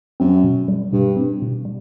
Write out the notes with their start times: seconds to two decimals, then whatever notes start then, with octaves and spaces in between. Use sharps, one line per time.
0.20 F#2 C4
0.44 B2
0.68 G3
0.93 G2 B2
1.17 C4
1.42 B2
1.65 G3